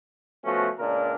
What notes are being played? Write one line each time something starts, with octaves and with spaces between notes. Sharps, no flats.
F3 A3 B3 C#4 F#4
C#2 A#2 D4 A#4